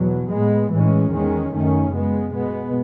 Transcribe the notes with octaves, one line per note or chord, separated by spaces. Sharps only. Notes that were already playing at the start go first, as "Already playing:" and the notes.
Already playing: E2 B2 F#3
A2 G#3 B3
A2 E3 G#3 C#4
E2 D#3 G#3 C#4
F#2 D#3 A3 C#4
C#3 G#3 B3
B2 G#3 B3